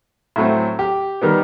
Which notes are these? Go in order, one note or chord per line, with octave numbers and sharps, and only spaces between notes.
A2 F#3 A3 C4
G4
D#3 G3 B3